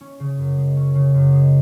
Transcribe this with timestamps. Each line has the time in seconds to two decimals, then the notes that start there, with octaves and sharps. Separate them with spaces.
0.01 C#4
0.20 C#3
0.38 F#2
0.58 G#3
0.76 C#4
0.95 C#3
1.14 F#2
1.33 G#3